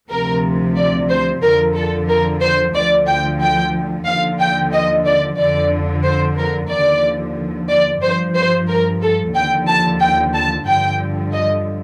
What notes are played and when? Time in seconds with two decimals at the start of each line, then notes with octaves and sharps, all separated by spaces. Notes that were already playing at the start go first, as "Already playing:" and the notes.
0.10 D2 C3 F3 A#4
0.76 D5
1.09 C5
1.42 F2 D3 F3 A#4
1.75 A4
2.09 A#4
2.41 C5
2.74 D2 D3 F3 D5
3.07 G5
3.41 G5
4.06 D#2 D3 F3 F5
4.39 G5
4.73 D#5
5.05 D5
5.39 F2 D3 F3 D5
6.05 C5
6.38 A#4
6.70 D#2 D3 F3 D5
7.70 D5
8.02 G2 F3 C5
8.36 C5
8.69 A#4
9.02 A4
9.35 D#2 D3 F3 G5
9.68 A5
10.01 G5
10.34 A5
10.67 G2 D3 F3 G5
11.33 D#5